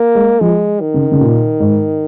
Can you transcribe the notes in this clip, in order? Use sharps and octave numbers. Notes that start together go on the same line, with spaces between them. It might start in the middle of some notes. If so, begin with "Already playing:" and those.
Already playing: A#3
G#3
F3 G#3
D#3
C#3
C#3
A#2
G#2